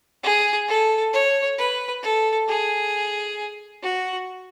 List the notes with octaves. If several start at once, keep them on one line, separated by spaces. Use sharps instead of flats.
G#4
A4
C#5
B4
A4
G#4
F#4